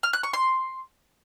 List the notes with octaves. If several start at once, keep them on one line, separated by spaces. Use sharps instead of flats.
F6
F#6
C#6
C6